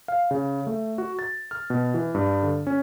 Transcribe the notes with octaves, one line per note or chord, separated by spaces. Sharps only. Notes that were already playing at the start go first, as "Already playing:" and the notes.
F5
C#3
A3
F#4
A6
F6
B2
E3
G2
D3
C#4